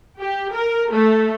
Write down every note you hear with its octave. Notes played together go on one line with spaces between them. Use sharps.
G4
A#4
A3